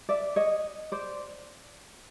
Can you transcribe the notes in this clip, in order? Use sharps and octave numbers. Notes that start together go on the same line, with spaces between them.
D5 E5
C#5 D#5
C5 D5